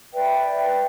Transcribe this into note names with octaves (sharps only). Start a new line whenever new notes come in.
B4 D5 E5 G5